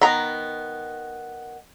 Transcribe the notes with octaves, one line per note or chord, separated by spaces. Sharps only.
D#3 B3 A#5